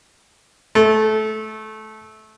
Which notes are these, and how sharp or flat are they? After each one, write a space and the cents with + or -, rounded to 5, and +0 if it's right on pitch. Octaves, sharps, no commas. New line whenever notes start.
A3 -20